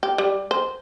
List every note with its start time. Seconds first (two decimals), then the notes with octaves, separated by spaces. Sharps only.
0.03 G4
0.18 G3
0.51 C5